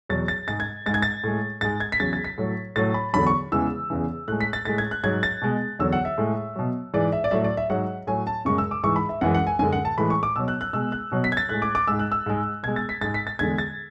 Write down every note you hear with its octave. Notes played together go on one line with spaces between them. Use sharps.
E2 B2 F#3 A6
A6
G#2 G#3 A6
G#6
G#2 G#3 A6
G#6
A6
A2 G#3
G#2 G#3 A6
G#6
B6
E2 C#3 F#3 A6
A6
B6
A2 F#3
A2 F#3 A6
B5
E2 D3 F#3 B5
C#6
E2 C#3 E3 G#3 E6
E2 C#3 E3
A2 G#3 F#6
B6
A6
A2 G#3 A6
G#6
F#6
G#2 F#3 G#6
A6
B2 G#3
E2 D3 F#3 E6
F#5
E5
A2 G#3
B2 F#3
G#2 E3 G#3 D5
E5
D5
A2 F#3 E5
D5
E5
G#2 F#3 F#5
A2 F#3 G#5
A5
F#2 C#3 G#3 C#6
E6
D6
G#2 E3 G#3 C#6
B5
E5
F#2 E3 G#3 F#5
F#5
G#5
F#2 D3 G#3 G#5
F#5
A5
A2 E3 G#3 B5
C#6
D6
B2 F#3 E6
F#6
F#6
B2 G#3 E6
F#6
B2 F#3
B6
G#6
A6
A2 G#3 F#6
D6
D6
G#2 G#3 E6
F#6
E6
G#2 G#3
B2 G#3 G#6
A6
B6
G#2 G#3 A6
B6
A6
E2 D3 G#3 G#6
A6